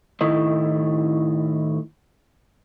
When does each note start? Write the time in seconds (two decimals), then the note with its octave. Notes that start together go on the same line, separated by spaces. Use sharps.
0.21 A2 D#3 E4 D#5